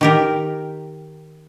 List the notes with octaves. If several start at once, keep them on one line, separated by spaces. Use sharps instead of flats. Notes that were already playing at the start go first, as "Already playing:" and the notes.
D#3 G4 A#4